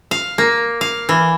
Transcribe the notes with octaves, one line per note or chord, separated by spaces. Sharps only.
F5
A#3
F5
E3